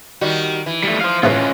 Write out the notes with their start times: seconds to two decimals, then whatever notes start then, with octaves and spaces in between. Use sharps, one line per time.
0.21 D#3 G3 F#4
0.66 E3
0.84 G3 A3
1.01 C5 F5
1.23 A1 A3 C#4 F4 B4